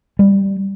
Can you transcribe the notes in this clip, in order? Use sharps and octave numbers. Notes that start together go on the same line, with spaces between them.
G3